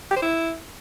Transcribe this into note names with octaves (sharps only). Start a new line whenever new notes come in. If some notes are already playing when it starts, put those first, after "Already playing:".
G4
C5
E4